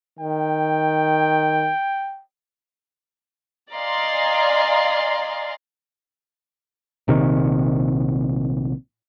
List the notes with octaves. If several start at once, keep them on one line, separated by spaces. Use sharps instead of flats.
D#3 G5
D5 D#5 F5 G#5 A#5 C6
A#1 C3 D#3